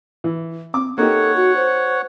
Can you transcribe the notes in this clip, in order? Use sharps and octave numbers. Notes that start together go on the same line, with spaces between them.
E3
C4 D6
A#3 D#4 G4 A4 C#5 F#5
F#4
C5